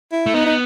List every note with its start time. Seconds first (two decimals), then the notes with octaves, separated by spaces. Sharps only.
0.12 E4
0.26 A3
0.34 B3 D#4
0.46 D#4